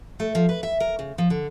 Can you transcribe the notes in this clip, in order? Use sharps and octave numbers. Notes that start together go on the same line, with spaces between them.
A3
F3
B4
E5
A#4
C#3
F3
D3